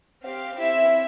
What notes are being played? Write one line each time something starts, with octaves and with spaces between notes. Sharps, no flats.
C4 G4 F5
C4 E4 G4 E5